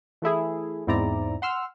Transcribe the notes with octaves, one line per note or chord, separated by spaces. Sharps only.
E3 A3 E4 G#4
E2 G#2 C4 E4 D5 A#5
F#5 C6 E6 F6